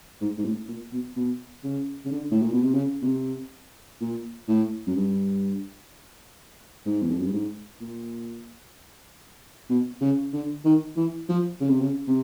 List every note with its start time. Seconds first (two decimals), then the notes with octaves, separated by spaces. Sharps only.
0.21 G#2
0.38 G#2
0.45 A2
0.68 A#2
0.92 B2
1.16 B2
1.64 C#3
2.06 C#3
2.12 D3
2.31 A2
2.42 A#2
2.52 B2
2.64 C3
2.74 C#3
3.02 B2
3.06 C3
4.01 A#2
4.48 A2
4.87 F#2
4.96 G2
6.86 G#2
7.02 E2
7.11 F2
7.19 F#2
7.26 G2
7.33 G#2
7.81 A#2
9.70 B2
10.01 C#3
10.33 D3
10.65 D#3
10.96 E3
11.29 F3
11.61 C#3
11.70 C3
11.81 C#3
12.08 C3